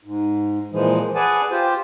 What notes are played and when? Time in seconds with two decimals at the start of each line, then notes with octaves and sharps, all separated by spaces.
0.05 G#2
0.72 A#2 E3 F3 G#3
1.15 G#4 B4 D5 F#5 G#5 A5
1.51 F4 G4 C5